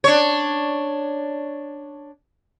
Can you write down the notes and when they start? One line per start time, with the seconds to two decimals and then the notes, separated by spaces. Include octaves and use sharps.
0.04 D4 C#5